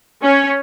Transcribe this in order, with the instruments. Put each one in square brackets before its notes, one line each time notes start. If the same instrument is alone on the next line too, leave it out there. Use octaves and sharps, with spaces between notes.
[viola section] C#4